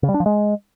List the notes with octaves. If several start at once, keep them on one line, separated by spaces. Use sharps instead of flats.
C#3
G3
D4
F3
G#3